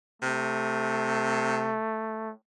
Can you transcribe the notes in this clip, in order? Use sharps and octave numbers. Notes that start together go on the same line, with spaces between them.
C3 A3